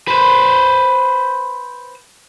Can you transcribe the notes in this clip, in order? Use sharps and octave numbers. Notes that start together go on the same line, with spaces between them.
B4 C5